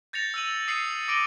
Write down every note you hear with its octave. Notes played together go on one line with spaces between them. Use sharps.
G6 A6 A#6 C#7 F7
E6 F6 D#7 F#7
D#6 E6 C7 C#7 D#7 F#7
D6 A#6 D7 D#7 F#7 G7